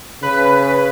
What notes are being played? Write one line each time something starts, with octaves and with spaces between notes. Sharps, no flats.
C#3 B4